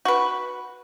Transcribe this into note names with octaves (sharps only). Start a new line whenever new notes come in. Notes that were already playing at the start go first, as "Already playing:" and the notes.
F#4 B4